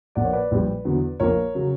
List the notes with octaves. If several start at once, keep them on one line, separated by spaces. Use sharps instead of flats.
A#1 A#2 A#3 D5 F#5
C#5
B4 D5
A#1 A#2 G3
E2 D3 F#3 B3
A#1 A#2 A#3 A#4 C#5
C#3 F#3